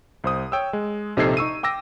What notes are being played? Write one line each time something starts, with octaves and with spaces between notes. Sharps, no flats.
C2 C5 D#6
C#5 G5 D#6 E6
G#3
A#1 C3 D#4 A4 G#6 C7
D#4 C#6 E6 D#7
G5 D6 E6 A#6